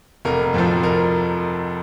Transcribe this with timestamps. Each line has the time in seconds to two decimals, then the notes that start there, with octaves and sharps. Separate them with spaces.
0.25 F1 A#4
0.54 F2 F3
0.83 F1 A#4